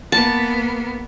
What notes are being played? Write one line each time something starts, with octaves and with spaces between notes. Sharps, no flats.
A#3 B3 A5